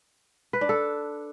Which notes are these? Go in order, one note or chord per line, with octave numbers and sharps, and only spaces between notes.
B4
D4
A4